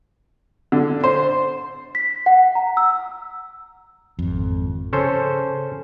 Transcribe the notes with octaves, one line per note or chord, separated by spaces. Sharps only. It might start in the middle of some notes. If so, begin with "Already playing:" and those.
D3
C5
B6
F#5
A#5
E6
G#1 F2
C#3 C#4 A4 C5